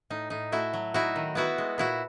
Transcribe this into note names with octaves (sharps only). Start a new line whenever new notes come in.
A2 D#4
A2 D#4
A3 E4 F#4
F#3
D#4 E4 F#4
D#3
B3 E4 F#4
G#3
A#2 E4 F#4